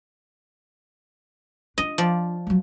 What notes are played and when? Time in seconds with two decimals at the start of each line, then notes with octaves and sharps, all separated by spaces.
1.78 D4 F4 D#5
1.98 F3 D5
2.47 F#3 G3